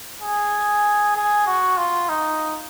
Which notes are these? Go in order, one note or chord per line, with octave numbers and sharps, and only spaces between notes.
G#4
G#4
F#4
F4
D#4